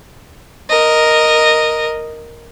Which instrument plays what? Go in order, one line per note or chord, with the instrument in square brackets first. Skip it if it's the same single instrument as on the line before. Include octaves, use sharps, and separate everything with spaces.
[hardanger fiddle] A#4 D#5